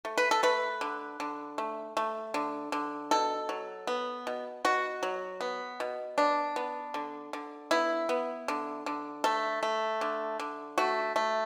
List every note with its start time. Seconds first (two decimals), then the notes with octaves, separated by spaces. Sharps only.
0.05 A3
0.18 B4
0.31 A4
0.43 A3 B4
0.81 D3
1.20 D3
1.58 A3
1.97 A3
2.34 D3
2.72 D3
3.11 B2 A4
3.49 F#3
3.87 B3
4.27 B2
4.65 B2 F#4
5.03 F#3
5.41 B3
5.80 B2
6.18 B3 D4
6.56 B3
6.94 D3
7.33 D3
7.71 B3 E4
8.09 B3
8.48 D3
8.86 D3
9.24 A3 A4
9.63 A3
10.01 D3
10.39 D3
10.78 A3 F#4
11.16 A3